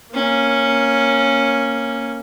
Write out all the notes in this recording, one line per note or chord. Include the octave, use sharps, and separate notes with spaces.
A#3 C#4